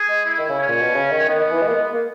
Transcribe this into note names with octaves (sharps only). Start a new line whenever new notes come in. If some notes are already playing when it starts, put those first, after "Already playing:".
Already playing: G#4
G#3
E4
D#3
C#3
C#4
A#2
B2
C#3
D#3
D#3 B3
D#3
E3
G#3
A#3
G#3
A#3